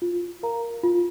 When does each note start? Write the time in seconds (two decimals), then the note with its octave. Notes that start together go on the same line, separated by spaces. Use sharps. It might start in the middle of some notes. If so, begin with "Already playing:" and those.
0.02 F4
0.43 A#4 F5 A#5
0.83 F4